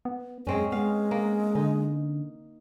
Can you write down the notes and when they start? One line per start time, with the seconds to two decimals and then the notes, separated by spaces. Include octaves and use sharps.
0.05 B3
0.47 F#2 G#3 C4 C#4 G#4
0.72 G#3 B3 F5
1.11 A#3
1.55 D3 D#4